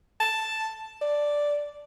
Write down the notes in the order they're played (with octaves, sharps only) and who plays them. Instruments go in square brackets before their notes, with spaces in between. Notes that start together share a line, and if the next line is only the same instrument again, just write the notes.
[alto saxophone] A5
D5